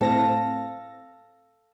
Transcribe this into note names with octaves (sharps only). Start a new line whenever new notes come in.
A2 C4 A4 F5 A#6